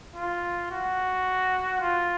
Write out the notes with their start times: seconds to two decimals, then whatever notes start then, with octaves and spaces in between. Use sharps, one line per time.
0.15 F4
0.70 F#4
1.80 F4